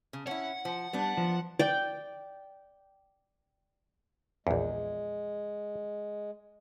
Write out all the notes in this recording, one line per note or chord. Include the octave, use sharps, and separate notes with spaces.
C#3
C#4 E4 F#5
F3
G3 B3 D4
F3
D5 G5
A#1 E2 G#3